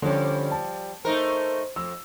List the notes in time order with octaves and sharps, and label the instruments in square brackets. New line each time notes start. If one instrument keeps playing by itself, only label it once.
[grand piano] D3 C#4 [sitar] F3 G3
[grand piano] A5
[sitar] A3 D#4 A#4 [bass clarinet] C5
[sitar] F2 [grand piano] E6